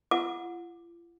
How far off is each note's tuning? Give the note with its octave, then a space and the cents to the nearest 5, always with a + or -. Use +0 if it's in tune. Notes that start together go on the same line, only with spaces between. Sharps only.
F4 -45 F#5 -25 D6 +10